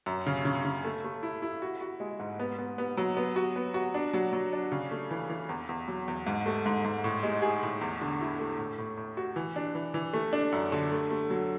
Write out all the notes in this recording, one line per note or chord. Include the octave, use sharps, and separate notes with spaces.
F#2
C#3
C#3
C#3
A3
A3
E4
E4
F#4
F#4
G#3
G#2
B3
B3
B3
F#3
B3
F#4
B3
F#4
D4
F#3
F#3
D4
C#3
A3
E3
E3
E2
E2
F#3
E2
G#2
A3
G#2
G#2
A2
G#3
G#4
A2
E2
D3
E4
A3
A2
A2
A2
F#4
E3
D4
E3
E3
A3
D4
F#2
D3
A3
A3
F#3